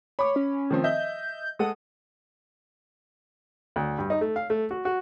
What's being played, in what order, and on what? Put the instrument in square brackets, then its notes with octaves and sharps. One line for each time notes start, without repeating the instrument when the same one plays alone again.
[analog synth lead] C#5 [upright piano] B5 D6
[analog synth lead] C#4
[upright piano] D#3 F3 C4
[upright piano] D#5 E5 [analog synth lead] G6
[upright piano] G#3 A4 F#5 [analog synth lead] D#6
[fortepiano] D2
G2
D#4
A3
F5
A3
F#4
F#4